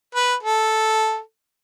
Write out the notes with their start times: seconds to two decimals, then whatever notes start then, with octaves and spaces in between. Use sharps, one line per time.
0.15 B4
0.43 A4